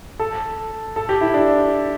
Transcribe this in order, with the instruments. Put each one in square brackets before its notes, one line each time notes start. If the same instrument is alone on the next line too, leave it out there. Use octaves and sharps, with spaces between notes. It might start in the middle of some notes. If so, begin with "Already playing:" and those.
[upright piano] A4
A4
G4
E4
D4